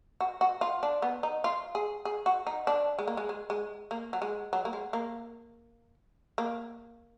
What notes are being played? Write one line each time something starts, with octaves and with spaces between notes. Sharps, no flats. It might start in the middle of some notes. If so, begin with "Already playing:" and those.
F#4
F#4
F4
D4
B3
D#4
F4
G#4
G#4
F#4
D#4
D4
G#3
A#3
G#3
G#3
G#3
A#3
F#3
G#3
F#3
A#3
G#3
A#3
A#3